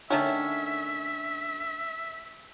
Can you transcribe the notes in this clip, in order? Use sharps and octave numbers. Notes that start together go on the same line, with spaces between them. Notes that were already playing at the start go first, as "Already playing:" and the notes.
D3 D#3 A3 C#4 E5